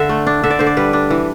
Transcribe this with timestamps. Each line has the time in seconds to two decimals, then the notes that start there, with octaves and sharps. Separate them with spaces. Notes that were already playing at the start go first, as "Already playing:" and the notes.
Already playing: D3 E5
0.09 A3
0.27 D4
0.43 D3 E5
0.50 D5
0.59 D3 C5
0.67 D5
0.77 G3 B4
0.93 D4
1.10 E3